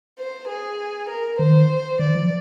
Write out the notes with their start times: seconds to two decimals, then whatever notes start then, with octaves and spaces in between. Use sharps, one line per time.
0.18 C5
0.48 G#4
1.09 A#4
1.39 D#3 C5
1.99 D#3 D5
2.15 F3